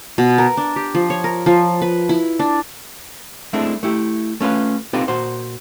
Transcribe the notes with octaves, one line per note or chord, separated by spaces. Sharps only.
B2
A#4
D4
G4
F3
C#5
A#4
F3
B4
E4
D4
G#3 A3 C4 D4 E4
A3 E4 G4
A3 C#4 F4 B4
C4 D#4 F4 G4 A4 B4
A#2 F#4 C5